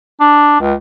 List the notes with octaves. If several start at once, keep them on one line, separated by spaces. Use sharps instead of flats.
D4
C#2